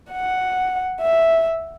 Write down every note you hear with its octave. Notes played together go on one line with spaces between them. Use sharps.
F#5
E5